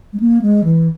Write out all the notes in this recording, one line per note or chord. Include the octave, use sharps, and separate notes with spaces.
G#3
A#3
G#3
E3